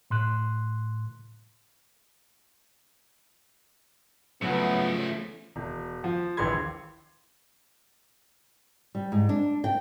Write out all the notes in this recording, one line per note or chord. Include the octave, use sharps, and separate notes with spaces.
A2 C6 F#6
C#3 F3 F#3 A3 B3
E1
F3
A#1 D#2 E3 C6 G#6
G3
G#2
D4
G5